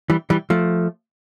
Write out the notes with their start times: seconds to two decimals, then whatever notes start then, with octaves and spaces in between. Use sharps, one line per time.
0.10 E3 G3
0.30 E3 G3
0.50 F3 A3